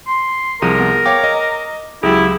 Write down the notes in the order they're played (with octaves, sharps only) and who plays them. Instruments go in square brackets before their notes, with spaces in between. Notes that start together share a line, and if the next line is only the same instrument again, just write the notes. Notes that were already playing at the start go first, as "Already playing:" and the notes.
[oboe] C6
[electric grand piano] C2 F3 D#7 [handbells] G#4 [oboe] A#4
[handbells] B3
[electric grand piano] C#5 F5 G5 [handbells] D6
[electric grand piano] D#5
[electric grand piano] C#2 F#3 G4 [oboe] E4 [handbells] G#4